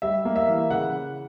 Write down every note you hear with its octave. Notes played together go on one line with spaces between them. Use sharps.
G3 E5
A#3
E5
E3
C#3 F#5